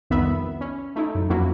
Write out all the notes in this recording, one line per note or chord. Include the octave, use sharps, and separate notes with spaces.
C2 F2 D#3 B3 E5 B5
C#4
A3 D#4 E4
F#2
F2 F#3 A#3 C#4 E4